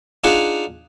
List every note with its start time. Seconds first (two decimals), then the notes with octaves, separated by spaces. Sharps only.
0.24 D4 D#4 F4 G#4 F#5